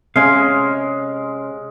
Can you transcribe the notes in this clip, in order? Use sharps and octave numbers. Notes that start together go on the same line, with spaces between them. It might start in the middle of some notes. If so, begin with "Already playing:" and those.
C3 G#3 C#4 F5